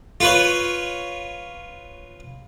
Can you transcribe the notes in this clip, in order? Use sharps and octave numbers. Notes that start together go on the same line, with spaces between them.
F4 B4 C#5